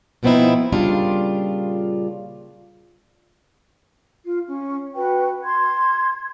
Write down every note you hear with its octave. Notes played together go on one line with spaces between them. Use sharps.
B2 F3 B3 C4 D#4 E4
A#2 C#3 G3 D4 F4
F4
C#4
F#4 B4 G5
C6 G#6